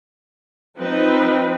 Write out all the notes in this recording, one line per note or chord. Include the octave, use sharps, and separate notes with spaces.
F3 C4 D#4 B4